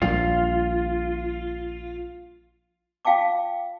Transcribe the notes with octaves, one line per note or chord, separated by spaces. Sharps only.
A#1 G3 F4
F4 F5 G5 A5 D6